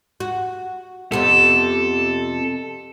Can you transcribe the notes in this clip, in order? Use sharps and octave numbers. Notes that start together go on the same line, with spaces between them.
F#4
F2 C3 B3 A4